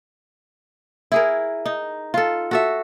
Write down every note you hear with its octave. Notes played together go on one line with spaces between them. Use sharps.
E4 G#4 A#4
D#4
F4 A4
F#4 A4 E5